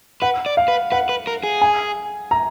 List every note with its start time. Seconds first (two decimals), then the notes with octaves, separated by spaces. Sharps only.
0.22 B4 F#5
0.46 D5
0.57 F5
0.68 B4
0.92 B4 F#5
1.09 B4
1.27 A#4
1.44 G#4
1.62 G#5
2.31 A#5